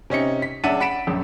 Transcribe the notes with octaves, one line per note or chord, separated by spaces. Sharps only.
C3 C#4 D#4 C#7
B6
F#1 D4 E5 F#5 A6 D#7
F#5 B5 B6 D7 E7
A#1 F#2